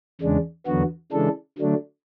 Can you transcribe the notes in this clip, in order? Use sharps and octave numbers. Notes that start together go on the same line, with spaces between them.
E2 C#3 G#3 D4
E2 D3 F#3 B3 F#4
C#3 E3 G#3 D4 A4
D3 F#3 A3 D4